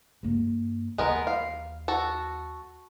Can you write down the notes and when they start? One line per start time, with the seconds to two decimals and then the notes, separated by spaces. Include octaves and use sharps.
0.23 G2 A#3
0.98 D#2 E3 G#3 B3 A#4
1.27 F5
1.88 F#4 A4